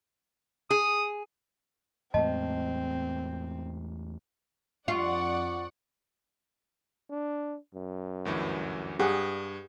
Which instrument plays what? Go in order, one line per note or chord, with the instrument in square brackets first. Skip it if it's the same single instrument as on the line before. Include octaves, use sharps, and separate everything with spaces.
[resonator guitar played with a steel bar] G#4 [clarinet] D#6
[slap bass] E2 A2 G#3 [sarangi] C4 [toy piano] D#5 A5
[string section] F2 D5 F#5 [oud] F4 [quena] C#6
[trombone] D4
F#2
[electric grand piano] D2 G2 E3
[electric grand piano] G2 [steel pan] G4 G#4 F#5